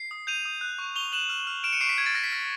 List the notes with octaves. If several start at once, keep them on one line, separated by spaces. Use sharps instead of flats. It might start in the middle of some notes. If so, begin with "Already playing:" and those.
Already playing: C7
D#6
G6 D#7 F7
D#6
F#6
C#6
C#6 F7 G7
F#6 E7 F#7
F6
F6
F6 D7 E7
C#7 D#7
C#6 C7 D7
B6
C#6 G#6
A6
F6 A#6
B6
F6 A#6